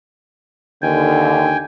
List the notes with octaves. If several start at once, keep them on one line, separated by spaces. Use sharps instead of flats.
D#2 D3 G5 G#5